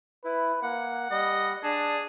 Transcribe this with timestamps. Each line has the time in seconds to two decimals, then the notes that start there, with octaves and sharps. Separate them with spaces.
0.25 E4 B4
0.62 A#3 F#5
1.11 G3 D#5
1.64 D4 G#4 A5